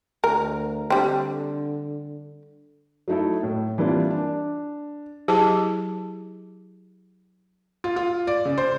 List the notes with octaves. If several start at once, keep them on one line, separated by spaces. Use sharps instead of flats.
D2 A#4
D3 G3 C4
F#3 A3 D#4 E4 A4
A2
E3 G3 A#3 C4 D4 F4
D4
F#3 E4 G4 G#4 C5 A5
F4
F4
D5
C#3
C5